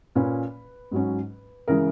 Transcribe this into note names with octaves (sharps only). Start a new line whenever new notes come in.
A#2 A#3 C#4 B4
G#2 F#3 C#4
C#3 E3 G#3 C#4 A#4